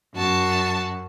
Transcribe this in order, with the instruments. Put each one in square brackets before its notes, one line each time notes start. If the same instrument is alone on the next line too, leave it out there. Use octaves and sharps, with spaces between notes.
[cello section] F#2 [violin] F#4 A5